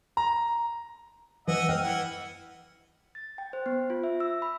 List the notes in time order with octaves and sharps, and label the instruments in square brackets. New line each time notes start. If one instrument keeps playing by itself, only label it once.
[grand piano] A#5
[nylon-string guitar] E3 [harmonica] D#5 E5 F#5
[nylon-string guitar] D#5 G5 [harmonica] F5
[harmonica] E3 F#5
[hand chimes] A6
G5
C5
B3
F4
E5
E6
B5